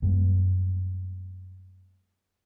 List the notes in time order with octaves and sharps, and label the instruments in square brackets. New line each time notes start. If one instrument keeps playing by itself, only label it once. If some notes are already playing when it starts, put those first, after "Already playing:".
[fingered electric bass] F#2 G3 G#3 B3